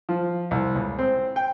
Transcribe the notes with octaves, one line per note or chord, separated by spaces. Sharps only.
F3
C2
C#2
C4
G5